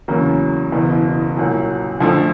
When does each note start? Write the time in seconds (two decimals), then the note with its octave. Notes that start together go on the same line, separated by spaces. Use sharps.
0.08 E2 C#3 F#3 A#3
0.72 F#1 E2 B2
1.37 C2 A#2 F#3
2.00 F2 D3 F3 A3